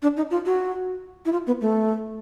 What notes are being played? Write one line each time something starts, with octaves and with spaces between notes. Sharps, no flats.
D4
D#4
F4
F#4
E4
F4
B3
A3